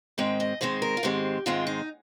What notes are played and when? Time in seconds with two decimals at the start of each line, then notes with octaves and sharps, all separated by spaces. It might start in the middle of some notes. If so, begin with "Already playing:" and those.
0.18 G#2 D#3 G#3 C4 G5
0.40 D#5
0.61 G#2 D#3 G#3 C4 C5
0.82 A#4
0.97 F4
1.03 G#2 D#3 G#3 C4 G4
1.46 G#2 D#3 G#3 C4 F4
1.67 D#4